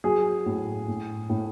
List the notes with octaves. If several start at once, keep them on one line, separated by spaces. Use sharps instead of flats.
F#3 G#4
A2
A2
A2